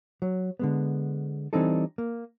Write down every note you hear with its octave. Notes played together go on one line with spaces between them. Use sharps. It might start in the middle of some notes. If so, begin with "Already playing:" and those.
F#3
D3 G#3 B3
E3 G3 C4 D4 D#4 A4
A#3